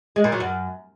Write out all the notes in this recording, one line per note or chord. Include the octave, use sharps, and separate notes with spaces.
G#3
A#2
F#3
F#2